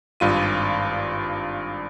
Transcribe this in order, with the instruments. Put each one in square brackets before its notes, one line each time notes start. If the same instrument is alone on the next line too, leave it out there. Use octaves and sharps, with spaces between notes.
[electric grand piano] G#1 G2 F4 D#7